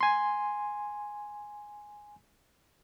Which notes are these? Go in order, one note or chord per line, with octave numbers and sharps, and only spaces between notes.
G#5 C6